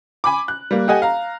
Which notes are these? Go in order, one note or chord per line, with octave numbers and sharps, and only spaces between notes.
G#5 B5 D6
F#6
G3 A#3
G4 A4 D#5 F#5 G#5
F5 A#5